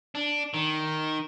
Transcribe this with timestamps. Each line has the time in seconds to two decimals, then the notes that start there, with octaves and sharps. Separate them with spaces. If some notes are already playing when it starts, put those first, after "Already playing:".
0.15 D4
0.54 D#3